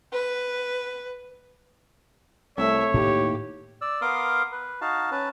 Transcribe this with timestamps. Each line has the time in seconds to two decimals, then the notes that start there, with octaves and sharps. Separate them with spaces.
0.13 B4
2.58 C2 A3 C#5 E5
2.94 D#2 A2 G4
3.81 D5 E6
4.01 B3 A#4 F5 C6 D6 D#6
4.52 B4
4.81 D#4 F#4 F5 A5
5.11 C#4 B4 A5